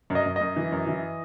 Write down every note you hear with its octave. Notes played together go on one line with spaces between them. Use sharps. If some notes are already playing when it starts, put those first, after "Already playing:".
F#2
D#5
F#2
D#5
F#2
E3
F#2
E3